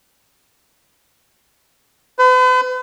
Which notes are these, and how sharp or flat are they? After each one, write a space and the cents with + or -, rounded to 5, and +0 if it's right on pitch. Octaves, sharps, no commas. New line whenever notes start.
B4 +45